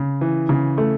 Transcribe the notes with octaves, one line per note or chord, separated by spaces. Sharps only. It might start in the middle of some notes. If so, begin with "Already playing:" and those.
Already playing: C#3
E3
C#3
A3